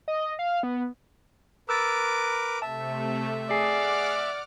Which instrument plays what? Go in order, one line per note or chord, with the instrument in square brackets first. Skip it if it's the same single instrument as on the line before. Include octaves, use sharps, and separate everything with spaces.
[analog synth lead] D#5
F5
B3
[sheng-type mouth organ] A#4 B4 D6 [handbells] E6 F#6 A6
[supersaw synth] C3 A3 [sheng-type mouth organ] E5 [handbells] A5
[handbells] G#4 G#5 C7 [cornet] D5 [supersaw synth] F#5 D6 F6